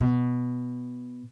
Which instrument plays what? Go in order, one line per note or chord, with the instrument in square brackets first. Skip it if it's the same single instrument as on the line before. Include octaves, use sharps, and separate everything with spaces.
[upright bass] B2